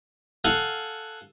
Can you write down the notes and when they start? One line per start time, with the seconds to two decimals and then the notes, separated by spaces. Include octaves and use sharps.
0.45 A4 F5 F#5 G#5